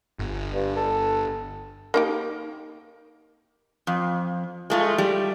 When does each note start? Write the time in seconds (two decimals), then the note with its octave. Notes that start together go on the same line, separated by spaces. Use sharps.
0.19 G1
0.54 G2
0.76 A4
1.94 A#3 D#4 G4
3.87 F2
4.70 G#3 A3 F4
4.98 G3